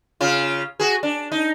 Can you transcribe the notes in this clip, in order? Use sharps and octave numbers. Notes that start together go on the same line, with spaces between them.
C#3 F4
F#4 G#4
D4
D#4